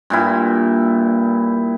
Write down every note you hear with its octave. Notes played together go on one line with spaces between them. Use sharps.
G2 A#2 E4